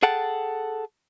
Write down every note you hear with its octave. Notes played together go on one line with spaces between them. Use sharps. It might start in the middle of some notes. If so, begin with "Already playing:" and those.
G#4 A4 F#5 G5 A5